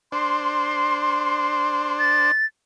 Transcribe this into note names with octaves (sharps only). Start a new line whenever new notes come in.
D4 C5 C6
A6